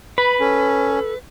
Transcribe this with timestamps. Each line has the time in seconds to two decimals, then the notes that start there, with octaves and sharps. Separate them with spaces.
0.18 B4 B5
0.40 C#4 A4